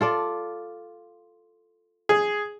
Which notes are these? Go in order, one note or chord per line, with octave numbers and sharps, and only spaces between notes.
F4 A4 D5
G#4